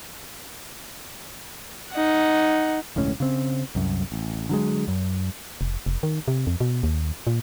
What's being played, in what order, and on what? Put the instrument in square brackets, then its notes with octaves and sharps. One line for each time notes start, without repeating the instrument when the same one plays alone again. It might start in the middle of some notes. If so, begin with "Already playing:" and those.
[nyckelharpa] D#4 F#5
[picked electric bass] E1 C#2 A2 C#4
C#3 C4
C2 F#2
A1
D3 F#3 G#3
F#2
[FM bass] F1
F1
D#3
C3
F2
B2
D#2
A#2